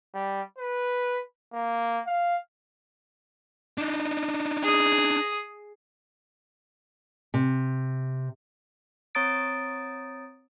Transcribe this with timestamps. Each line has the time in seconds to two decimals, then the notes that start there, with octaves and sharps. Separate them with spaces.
0.14 G3
0.58 B4
1.53 A#3
2.06 F5
3.78 D4 D#4
4.63 G#4 D#6
7.34 C3
9.15 C4 C#5 A#5 D#6 A6 D7